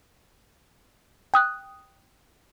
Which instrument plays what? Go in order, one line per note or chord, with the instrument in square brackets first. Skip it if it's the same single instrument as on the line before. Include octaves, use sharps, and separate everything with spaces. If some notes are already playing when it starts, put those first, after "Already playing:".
[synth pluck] G5 D#6 F#6